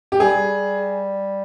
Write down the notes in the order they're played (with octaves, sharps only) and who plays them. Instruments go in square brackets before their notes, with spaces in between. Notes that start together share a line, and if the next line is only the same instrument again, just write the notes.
[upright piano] G4
[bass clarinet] G3 [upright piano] G#4